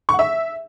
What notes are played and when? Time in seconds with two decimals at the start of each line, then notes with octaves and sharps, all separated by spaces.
0.09 C#6
0.14 F#5
0.19 E5